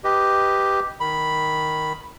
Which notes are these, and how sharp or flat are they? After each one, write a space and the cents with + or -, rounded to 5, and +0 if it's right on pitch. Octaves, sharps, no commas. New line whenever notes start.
G4 +0 B4 +0 D#5 +5
D#3 +0 B5 +0